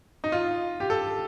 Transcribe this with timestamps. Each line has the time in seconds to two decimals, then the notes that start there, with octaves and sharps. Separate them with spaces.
0.24 D#4
0.32 F4
0.80 G4
0.90 A4